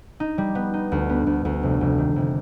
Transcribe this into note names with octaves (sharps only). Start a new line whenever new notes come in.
D#4
G3
B3
D#4
D2
B3
D2
D2
F1
F1
D#3
F1